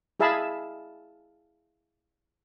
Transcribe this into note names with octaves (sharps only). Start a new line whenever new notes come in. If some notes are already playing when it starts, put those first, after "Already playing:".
E4 G#4 E5 F5 A5 B5